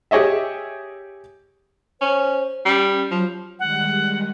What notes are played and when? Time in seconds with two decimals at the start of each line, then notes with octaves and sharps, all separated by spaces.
0.11 G4 G#4 C#5 D#5 E5
2.01 C#4 C5
2.66 G3 C#4
3.11 F3 F#3
3.59 D#3 G3 G#3 F#5